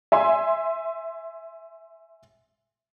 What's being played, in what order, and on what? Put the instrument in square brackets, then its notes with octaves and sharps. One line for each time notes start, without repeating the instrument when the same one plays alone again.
[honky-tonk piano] E5 G#5 C6